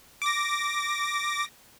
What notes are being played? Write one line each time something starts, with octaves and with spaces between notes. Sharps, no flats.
D6 A#6